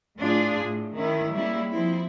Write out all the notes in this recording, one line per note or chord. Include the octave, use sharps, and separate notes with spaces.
A2 D4 F4 G#4
A2
D#3 C#4 E4
G3 G#3 A#3 C#4 E4
F3 C4 E4